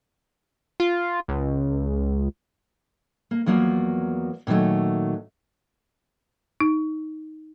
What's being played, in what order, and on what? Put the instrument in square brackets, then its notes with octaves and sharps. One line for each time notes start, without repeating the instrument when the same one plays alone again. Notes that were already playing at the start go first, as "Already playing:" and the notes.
[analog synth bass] F4
C#2
[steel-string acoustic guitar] A#3
E2 F3 F#3 A#3 D5
A#2 D#3 F3 F#3 A3
[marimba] D#4